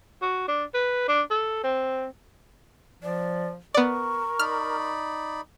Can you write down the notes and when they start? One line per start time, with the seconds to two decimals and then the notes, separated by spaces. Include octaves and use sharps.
0.22 F#4
0.48 D4
0.74 B4
1.08 D4
1.31 A4
1.64 C4
3.03 F3 D5
3.74 B3 A#4 D5 C#6
4.39 D#4 D5 B5 F6